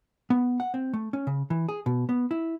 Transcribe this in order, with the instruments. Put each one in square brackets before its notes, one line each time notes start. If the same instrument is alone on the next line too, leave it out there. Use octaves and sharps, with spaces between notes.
[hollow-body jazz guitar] B3
F#5
C4
A3
C#4
C#3
E3
G#4
B2
B3
E4